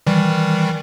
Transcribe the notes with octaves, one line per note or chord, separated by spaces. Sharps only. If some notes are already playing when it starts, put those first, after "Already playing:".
D#3 E3 G3